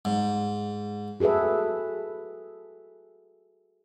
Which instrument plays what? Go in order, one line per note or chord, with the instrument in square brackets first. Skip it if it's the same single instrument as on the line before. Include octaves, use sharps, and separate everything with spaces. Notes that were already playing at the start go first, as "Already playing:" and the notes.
[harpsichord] G#2
[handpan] F#4 G#4 A4 B4 E5